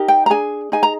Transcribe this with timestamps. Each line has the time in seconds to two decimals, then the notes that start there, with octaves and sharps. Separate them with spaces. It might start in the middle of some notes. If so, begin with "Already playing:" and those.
Already playing: D#4 G4 A#4
0.08 G5
0.26 A#5
0.30 D4 G#4 G#5
0.72 D#4 G#4 G#5
0.83 A#5